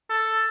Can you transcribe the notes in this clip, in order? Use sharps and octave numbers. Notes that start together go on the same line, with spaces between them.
A4